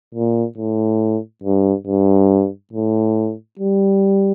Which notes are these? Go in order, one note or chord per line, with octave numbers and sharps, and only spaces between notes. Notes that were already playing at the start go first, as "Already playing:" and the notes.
A#2
A2
G2
G2
A2
G3